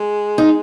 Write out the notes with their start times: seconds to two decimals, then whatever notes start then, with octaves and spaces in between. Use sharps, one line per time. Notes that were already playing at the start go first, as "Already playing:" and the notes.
Already playing: G#3
0.38 D#4